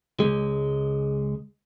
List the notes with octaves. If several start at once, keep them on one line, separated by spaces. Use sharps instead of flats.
C#2 G#2 G#3